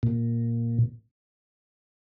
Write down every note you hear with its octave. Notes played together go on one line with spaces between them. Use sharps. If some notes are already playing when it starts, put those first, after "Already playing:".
A#2